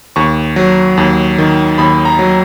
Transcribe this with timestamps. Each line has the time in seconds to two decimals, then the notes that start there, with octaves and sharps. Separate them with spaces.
0.16 D#2 C#6
0.56 F#3
0.97 D#2
1.38 D#3
1.78 D#2 B5
2.05 A#5
2.19 F#3